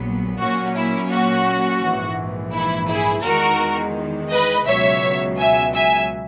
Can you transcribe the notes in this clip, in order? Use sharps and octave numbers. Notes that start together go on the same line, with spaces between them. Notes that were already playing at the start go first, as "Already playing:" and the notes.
Already playing: A#1 A#2 F#3 B3
A#2 F#3 A#3 C#4 F#4
E4
F#4
A#1 G#2 E3
E4
E4 G#4
E2 D#3 G#3 F#4 A#4
B4 D#5
C#2 B2 F#3 C#5 E5
E5 G#5
E5 G#5